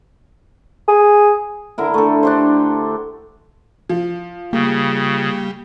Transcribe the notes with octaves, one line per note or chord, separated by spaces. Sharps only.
G#4
D3 E4 A#4
A3 A4
D4 G4 C5
F3
C#3 G3 A#3